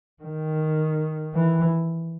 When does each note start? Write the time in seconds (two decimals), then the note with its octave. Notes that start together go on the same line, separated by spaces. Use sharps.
0.23 D#3
1.35 E3